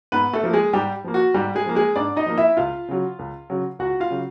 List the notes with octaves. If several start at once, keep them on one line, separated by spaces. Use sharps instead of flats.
G#2 B3 B4
A3 A4
F3 A#3
G#3 G#4
G#2 G3 G4
F3 A#3
F#4
G#2 G3 G4
G#3 G#4
F3 A#3
G#3 G#4
G#2 D4 D5
D#4 D#5
F3 A#3
E4 E5
C#2 F4 F5
C#3 F#3
C#2
C#3 F#3
C#2 F#4 F#5
F4 F5
C#3 F#3